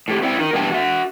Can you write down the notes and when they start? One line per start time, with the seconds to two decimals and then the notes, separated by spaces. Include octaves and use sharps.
0.08 A2 G4
0.22 C4 E4 D5 G5
0.39 D#4 A#4
0.53 B2 E3 G3 D4 G5 A5
0.71 F#4 E5